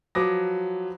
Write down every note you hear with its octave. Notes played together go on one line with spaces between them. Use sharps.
F3 F#3 B4 D6 D#6 A#6